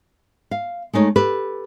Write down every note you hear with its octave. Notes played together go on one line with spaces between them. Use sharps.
F5
G#3 A3 D#4 C#5
G4 A4 B4